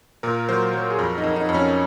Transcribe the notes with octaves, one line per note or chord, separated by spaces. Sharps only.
A#2 A#4
F#3 C5
F#3 C#5
G#4
F2 A#4
D#4
F2
D#4
F2
C#4